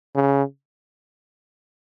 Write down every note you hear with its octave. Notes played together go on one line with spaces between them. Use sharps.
C#3